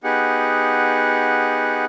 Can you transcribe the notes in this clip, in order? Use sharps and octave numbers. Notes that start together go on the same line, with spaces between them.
B3 D#4 G4 G#4 F#5